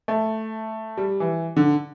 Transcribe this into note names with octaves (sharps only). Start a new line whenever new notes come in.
A3
G3
E3
D3